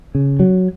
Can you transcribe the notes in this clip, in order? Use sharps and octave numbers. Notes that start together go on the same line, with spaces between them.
C#3
F#3